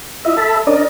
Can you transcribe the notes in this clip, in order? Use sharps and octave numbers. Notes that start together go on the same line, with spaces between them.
E4 F4 D#5 E5
A4 E5 A5 B5
C#4 D4 A#4 D5 D#5